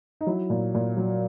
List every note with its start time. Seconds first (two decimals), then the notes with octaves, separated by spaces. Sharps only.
0.21 D#4
0.27 F#3 E4
0.50 A#2
0.75 A#2
0.97 F#3